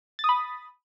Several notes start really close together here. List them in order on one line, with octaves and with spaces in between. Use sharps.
A6 D#6 B5